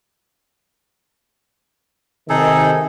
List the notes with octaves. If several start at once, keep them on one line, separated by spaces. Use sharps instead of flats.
C3 D#3 D#4 G#4 A4